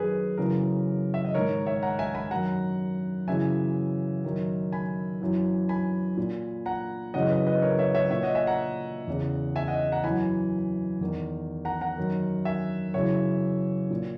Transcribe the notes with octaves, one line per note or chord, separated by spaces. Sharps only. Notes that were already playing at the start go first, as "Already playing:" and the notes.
Already playing: F#2 D#3 G#4 B4
F#2 C#3 E3 A#4
E5
D#5
G#2 D#3 A#4 C#5
C#5 E5
F#5 A#5
E5 G#5
G#5 B5
F#2 D#3 F#5 A#5
F#2 C#3 E3 E5 G#5
F#2 D#3
G#5 B5
F#2 E3
G#5 B5
A#2
F#5 A#5
F#2 C#3 E3 D#5 F#5
B4 D#5
B4 D#5
A#4 C#5
C#5 E5
C#5 E5
A#2 C#5 E5
D#5 F#5
E5 G#5
F#5 A#5
E2 C#3 E3
E5 G#5
D#5 F#5
F#5 A#5
F#2 E3 G#5 B5
E2 D#3
F#5 A#5
F#5 A#5
F#2 D#3
E5 G#5
F#2 C#3 E3 C#5 E5
A#2